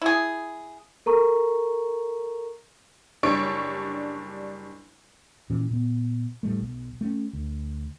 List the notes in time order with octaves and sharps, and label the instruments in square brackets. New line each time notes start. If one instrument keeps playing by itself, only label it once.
[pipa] E4 G#4
[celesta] A4 A#4 A#5 C#6
[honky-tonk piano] F#1 G3 D4 C#5 C#6 D7
[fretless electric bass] A#2 E3 C#4
A#2 B3
A2 G3 A3
B1
A3 B3 C#4
D2